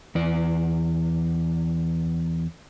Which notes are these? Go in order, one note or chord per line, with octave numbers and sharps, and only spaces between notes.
E2 D5